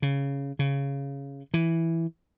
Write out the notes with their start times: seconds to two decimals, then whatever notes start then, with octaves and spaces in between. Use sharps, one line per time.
0.02 C#3
0.59 C#3
1.54 E3